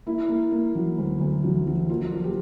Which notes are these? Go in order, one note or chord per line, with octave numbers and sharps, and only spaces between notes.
A#3 E4
A#3
A#3
F#3
D2
D2
F#3
F#3
A#3 F4
F3
G4